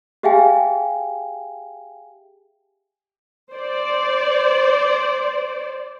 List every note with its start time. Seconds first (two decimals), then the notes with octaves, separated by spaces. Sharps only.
0.23 G4 G#4 E5 F5 G5 G#5
3.52 C5 D5